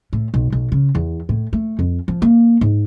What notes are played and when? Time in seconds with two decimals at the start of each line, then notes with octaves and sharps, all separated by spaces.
0.13 A2
0.34 B1
0.52 B1
0.72 C#3
0.95 E2
1.29 A2
1.53 A3
1.79 F2
2.08 F3
2.22 A#3
2.61 G#2